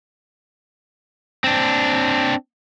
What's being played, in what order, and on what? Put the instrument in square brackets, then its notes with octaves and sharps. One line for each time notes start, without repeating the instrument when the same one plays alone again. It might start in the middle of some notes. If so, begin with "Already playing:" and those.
[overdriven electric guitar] C4 D4